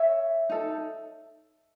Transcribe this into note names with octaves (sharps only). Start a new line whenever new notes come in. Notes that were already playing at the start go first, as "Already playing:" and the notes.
Already playing: C#5 E5
D#4 A4